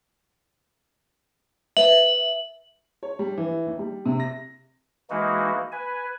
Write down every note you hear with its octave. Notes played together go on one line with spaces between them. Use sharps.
B4 E5 F#7
C#5
G3
E3
D#2
G3
C3
A#6
E3 G#3 A#3 D#4 F#4
B4 G#5